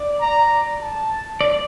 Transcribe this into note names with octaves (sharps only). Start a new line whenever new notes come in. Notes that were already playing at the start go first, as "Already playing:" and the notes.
Already playing: D5
A#5
A5
D5